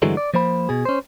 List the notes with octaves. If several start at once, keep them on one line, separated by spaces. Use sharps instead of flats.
G2 D3 E3 F#3 G#3 A3
D5
F3 A#3 C5 B5
B2 G#4
C#4 C5